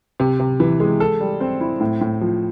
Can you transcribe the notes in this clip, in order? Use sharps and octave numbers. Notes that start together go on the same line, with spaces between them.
C3
C3
E3
G#3
A4
G3
C4
E4
A2
A2
F3